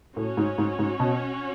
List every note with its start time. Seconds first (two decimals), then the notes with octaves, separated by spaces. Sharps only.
0.16 A2 C#4 F#4 C#5
0.37 G#2
0.58 G#2
0.79 G#2
1.00 B2